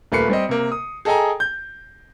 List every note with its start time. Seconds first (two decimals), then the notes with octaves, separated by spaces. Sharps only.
0.12 D#1 A3 A#3 B4 C7 C#7
0.30 G3 C4 D#5
0.49 C3 A#3
0.72 D#6
1.05 G#4 A4 D#5 G5 G#5 A#5
1.40 G6